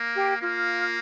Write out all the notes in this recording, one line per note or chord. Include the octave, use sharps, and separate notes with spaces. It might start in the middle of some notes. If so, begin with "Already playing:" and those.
Already playing: A#3
G4
A#3 F4